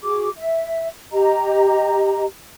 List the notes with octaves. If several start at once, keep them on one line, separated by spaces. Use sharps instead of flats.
F#4 G#4 D6
E5
G4 D#5 A#5